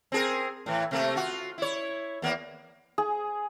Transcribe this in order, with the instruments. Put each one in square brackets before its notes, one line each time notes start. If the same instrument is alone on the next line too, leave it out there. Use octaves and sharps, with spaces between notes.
[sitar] C4 G#4 A#4
A2 E3
C3 A3 A#3
F4 F#4
E4 C#5
E2 A#3 B3
[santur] G#4